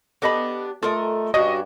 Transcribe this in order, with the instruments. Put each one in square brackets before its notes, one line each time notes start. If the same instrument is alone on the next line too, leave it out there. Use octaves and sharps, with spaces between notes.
[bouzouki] B3 D4 G4 [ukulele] A4 D#5 B5
[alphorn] A3 [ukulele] F4 [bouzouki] A4 A#4 D#5
[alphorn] G2 [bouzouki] C#4 D4 F#4 [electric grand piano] D#5